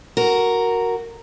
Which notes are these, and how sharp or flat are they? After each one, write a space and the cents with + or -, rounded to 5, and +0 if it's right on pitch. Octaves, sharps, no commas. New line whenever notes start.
F#4 +0 A#4 -5